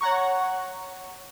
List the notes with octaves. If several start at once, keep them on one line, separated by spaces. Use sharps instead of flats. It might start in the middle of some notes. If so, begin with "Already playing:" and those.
C#5 F#5 A#5 C#6